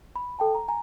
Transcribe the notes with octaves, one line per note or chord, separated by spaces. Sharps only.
B5
A4 G5 A5
A#5
G#5 A#5